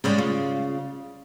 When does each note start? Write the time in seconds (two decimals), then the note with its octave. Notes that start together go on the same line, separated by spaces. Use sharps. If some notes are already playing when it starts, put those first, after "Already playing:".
0.04 G#2 C#3 G3 G#3
0.18 F4